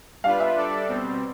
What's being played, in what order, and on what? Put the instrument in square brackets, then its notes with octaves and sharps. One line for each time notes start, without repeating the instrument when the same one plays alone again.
[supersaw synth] G3 D4 F4 B4 [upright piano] F5
[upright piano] E5
[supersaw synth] G3 D4 A4 D5
B2 G3 C4